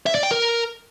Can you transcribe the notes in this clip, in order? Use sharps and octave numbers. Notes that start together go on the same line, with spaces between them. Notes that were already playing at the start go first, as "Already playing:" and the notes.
E5
D5
G5
A#4